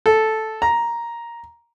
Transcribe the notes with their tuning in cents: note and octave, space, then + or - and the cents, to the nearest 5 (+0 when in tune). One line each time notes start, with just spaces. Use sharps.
A4 -5
A#5 +5